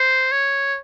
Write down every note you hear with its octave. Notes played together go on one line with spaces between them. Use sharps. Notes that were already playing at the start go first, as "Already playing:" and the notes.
Already playing: C5
C#5